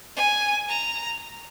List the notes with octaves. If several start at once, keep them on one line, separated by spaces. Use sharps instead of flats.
G#5
A#5